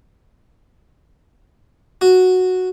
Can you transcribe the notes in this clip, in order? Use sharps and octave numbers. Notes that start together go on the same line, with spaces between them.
F#4